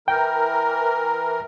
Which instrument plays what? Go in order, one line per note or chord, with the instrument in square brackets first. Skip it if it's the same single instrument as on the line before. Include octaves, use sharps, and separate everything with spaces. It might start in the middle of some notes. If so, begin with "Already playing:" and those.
[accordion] E3 A#4 [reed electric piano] G5